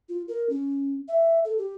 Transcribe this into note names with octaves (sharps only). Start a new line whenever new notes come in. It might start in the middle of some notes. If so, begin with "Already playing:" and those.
F4
A#4
C#4
E5
A4
G4